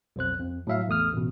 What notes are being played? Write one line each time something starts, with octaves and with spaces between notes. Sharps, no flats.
B1 F2 C5 F#6
F2
A2 F#3 E5 F5
A1 E2 A3 D#6 F6
A1 B2